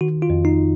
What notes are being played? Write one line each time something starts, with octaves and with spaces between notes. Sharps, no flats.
D#3 F#4
F4
F2
D#4